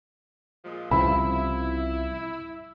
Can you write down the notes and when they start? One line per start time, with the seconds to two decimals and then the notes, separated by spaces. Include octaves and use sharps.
0.64 A#2 F3 G#3
0.91 C2 C#3 F3 E4 B5